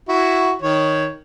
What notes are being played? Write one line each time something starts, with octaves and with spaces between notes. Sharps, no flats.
E4 F#4
D#3 C#5